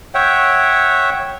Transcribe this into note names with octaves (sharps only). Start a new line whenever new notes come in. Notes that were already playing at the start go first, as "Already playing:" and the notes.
C#5 E5 F#5 G5